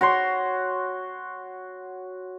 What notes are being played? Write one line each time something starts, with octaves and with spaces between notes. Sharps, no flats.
F#4 C#5 C6